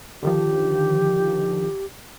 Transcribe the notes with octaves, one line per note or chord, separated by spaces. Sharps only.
D3 D#3 F3 G4